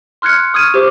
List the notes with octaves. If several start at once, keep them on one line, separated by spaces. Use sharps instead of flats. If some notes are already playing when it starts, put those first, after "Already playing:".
C6 F6 F#6 G#6 C#7
C#6 D#6 F6 G#6 D#7
G4 C5 D6